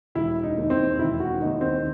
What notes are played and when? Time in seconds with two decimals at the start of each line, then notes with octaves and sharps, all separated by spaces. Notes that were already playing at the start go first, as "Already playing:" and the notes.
0.15 E1 E4
0.43 D#4
0.57 D#2 D#3
0.70 C4
0.98 E1 E4
1.20 F#4
1.40 D#2 D#3 D#4
1.61 C4